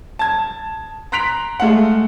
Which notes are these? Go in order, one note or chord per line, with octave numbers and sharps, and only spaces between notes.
A5 G#6
A#5 C6 F#6 B6 D7 F7
G#3 A3 F5 F#5